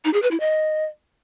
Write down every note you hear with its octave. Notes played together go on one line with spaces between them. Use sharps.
D#4
G#4
B4
E4
D#5